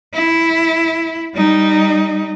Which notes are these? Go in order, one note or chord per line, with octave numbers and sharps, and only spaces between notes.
E4
G3 D#4